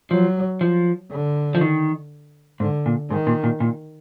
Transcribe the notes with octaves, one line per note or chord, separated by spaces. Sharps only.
F3 F#3
F3
D3
F3
D#3
G#2 D3
A#2
G#2 D#3
A#2
A#2
A#2